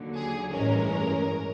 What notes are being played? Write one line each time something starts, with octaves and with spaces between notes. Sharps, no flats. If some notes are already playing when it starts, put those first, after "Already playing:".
Already playing: D#2 D3 F#3
G#4
A1 G2 E3 G#3 C#4 A#4